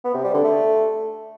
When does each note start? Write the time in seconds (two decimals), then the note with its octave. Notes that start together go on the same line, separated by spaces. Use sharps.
0.05 B3
0.14 C3
0.24 G3
0.34 D3
0.44 A3